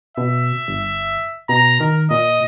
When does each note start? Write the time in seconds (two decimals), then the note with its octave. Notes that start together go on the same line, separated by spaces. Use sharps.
0.17 B2 E5
0.68 G1
1.49 B2 A#5
1.80 D#3 A#4
2.11 A#2 D#5